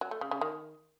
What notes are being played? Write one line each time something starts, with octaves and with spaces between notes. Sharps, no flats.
F#3
A3
C#3
C#3
D#3